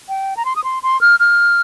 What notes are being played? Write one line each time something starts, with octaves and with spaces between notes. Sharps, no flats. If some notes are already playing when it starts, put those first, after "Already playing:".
G5
A#5
C6
D#6
C6
C6
F6
F6